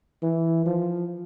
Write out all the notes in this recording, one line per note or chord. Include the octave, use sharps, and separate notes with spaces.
E3
F3